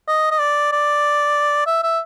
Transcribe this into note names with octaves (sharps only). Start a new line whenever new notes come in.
D#5
D#5
D5
D5
E5
E5